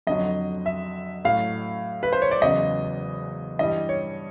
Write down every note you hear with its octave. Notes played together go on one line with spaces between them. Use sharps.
F2 D3 F#3 D#5
E5
A2 F#3 F5
B4
C5
C#5
D5
E2 C#3 F#3 D#5
G2 E3 G3 D#5
C#5